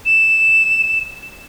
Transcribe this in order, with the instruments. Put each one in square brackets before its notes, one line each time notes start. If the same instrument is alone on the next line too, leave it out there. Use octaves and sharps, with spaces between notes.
[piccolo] E7